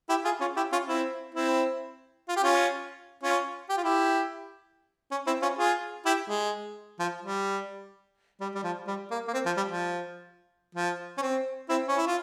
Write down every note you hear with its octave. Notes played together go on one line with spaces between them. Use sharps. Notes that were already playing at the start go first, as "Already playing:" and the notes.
E4 G4
F4 G#4
C#4 F4
E4 G4
C#4 F4
C4 E4
C4 E4
F4
G4
C#4 F4
C#4 F4
G4
F4
E4 G4
C#4
C4 E4
C#4 F4
F4 G#4
E4 G4
G#3
F3
G3
G3
G3
F3
G3
A#3
A#3
C4
F3
G3
F3
F3
C#4
C4
C4 E4
C#4
E4
F4